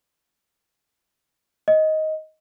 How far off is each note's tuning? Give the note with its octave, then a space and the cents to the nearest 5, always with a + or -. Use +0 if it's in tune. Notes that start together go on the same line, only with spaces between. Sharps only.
D#5 +10